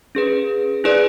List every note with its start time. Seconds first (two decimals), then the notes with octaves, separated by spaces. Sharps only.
0.15 C#4 G#4 B4
0.84 E4 G#4 B4 D5